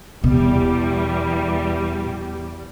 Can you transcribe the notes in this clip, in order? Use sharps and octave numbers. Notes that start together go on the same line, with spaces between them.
E2 B2 G3